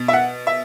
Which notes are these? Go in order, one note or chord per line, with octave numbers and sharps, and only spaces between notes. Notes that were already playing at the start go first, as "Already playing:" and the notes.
Already playing: B2
E5
F#5
E5